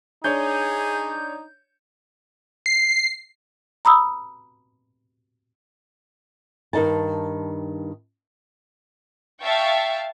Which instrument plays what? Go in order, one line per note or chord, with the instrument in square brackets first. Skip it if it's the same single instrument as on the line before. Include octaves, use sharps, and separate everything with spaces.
[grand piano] D4 C#5 [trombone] D#4 [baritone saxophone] G#4 [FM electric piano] G6
[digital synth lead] C7
[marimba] A#5 B5 D#6 E6
[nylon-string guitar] G2 D#3 D#4 A5
[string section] E5 F5 G5 A5 C#6